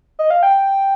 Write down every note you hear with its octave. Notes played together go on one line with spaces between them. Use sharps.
D#5
F5
G5